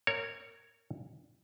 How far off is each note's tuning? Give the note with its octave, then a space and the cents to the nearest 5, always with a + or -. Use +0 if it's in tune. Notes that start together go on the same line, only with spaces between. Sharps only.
A#4 -20 C#5 +0